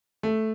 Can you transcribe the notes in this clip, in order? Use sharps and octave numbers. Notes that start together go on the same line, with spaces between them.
A3